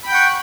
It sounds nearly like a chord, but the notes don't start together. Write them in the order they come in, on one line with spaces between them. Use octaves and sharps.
B5 G5 G6 F#5 C#6